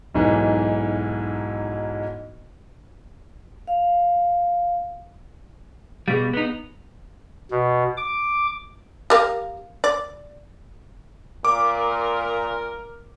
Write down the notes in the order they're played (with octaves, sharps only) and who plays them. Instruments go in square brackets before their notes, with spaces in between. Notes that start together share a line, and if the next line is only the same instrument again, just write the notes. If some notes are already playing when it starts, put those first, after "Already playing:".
[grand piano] B1 G#2 E3
[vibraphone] F5
[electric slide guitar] B2 G3 [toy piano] G#4 F5
[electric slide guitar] B3 D#4
[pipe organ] B2
D6
[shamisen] G4 A#4 F5
D5
[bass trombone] A#2 [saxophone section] A#4 [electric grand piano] D6